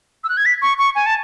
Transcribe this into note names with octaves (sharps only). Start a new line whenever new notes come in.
E6
F#6
G#6
B6
C#6
C#6
G#5
A5